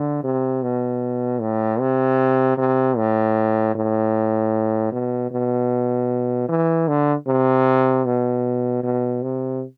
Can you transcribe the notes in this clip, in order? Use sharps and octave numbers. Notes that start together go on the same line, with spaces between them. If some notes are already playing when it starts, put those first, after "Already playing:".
Already playing: D3
C3
B2
A2
C3
C3
A2
A2
B2
B2
E3
D3
C3
B2
B2
C3